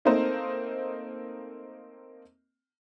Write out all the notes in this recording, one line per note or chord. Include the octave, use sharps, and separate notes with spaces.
A3 A#3 C4 D#4 C5